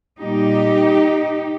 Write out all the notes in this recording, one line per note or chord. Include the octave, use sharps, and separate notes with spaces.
A#2 G3 D#4 G4